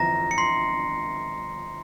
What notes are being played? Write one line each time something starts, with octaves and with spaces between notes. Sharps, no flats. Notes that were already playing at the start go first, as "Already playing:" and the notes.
Already playing: G1 F2 E3 A#5 A#6
C#7
C6 C7